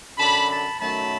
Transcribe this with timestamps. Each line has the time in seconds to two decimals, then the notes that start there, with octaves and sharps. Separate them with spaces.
0.18 F#2 D3 F#3 A5 B5
0.49 A5 B5
0.79 F#2 D#3 F#3 A3 A5 B5